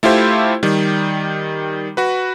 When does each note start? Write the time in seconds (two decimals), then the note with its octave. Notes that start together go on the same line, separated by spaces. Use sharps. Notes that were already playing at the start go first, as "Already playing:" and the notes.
0.03 A3 E4 F4 G4 C5
0.63 D#3 G3
1.97 F#4 B4